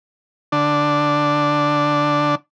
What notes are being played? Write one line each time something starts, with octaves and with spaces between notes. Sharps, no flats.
D3 D4